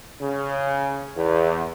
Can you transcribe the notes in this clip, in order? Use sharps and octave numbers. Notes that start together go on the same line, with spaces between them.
C#3
E2